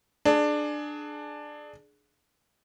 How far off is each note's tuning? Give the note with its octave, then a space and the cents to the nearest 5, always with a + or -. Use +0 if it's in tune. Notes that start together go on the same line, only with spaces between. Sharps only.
D4 +15 G#4 +25